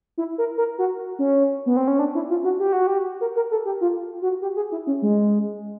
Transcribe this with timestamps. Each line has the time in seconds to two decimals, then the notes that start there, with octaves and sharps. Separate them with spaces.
0.18 E4
0.38 A#4
0.58 A#4
0.78 F#4
1.19 C#4
1.66 B3
1.77 C4
1.88 C#4
1.99 D4
2.15 E4
2.30 F4
2.44 F#4
2.60 G4
2.73 F#4
2.87 G4
3.21 A#4
3.36 A#4
3.51 A4
3.65 G4
3.81 F4
4.22 F#4
4.42 G4
4.56 G#4
4.72 E4
4.87 C#4
5.02 G#3